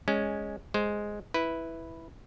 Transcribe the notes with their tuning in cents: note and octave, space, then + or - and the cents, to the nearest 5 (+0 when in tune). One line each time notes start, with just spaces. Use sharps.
G#3 -5 C#4 +0
G#3 +0 C5 +0
E4 -5 B4 +0